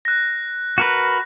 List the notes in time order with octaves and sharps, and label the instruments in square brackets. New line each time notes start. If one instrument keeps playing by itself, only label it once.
[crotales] F#6 A#6
[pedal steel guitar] F#4 A#4 B4